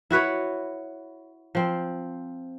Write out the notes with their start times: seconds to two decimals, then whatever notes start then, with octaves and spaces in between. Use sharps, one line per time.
0.11 E4 F#4 B4 C#5
1.55 F3 C4